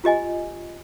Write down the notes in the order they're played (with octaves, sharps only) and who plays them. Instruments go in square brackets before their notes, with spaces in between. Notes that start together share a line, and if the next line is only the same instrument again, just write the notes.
[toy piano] F4 G4 D#5 G#5